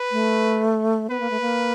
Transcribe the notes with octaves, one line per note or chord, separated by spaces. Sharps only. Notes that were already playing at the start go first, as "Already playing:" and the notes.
Already playing: B4
A3
B3 B4
A#3
A3
A#3